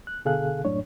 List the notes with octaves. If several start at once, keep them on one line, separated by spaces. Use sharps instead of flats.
F#6
B2 D3 G#4 A4 F5 F#6
F#2 A2 D4 C#5